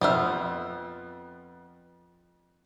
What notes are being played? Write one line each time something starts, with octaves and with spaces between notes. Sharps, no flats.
F2 B3 C5 E5 F6